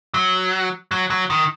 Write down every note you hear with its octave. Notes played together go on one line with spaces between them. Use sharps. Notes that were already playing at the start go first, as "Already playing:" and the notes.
F#3
F#3
F#3
D#3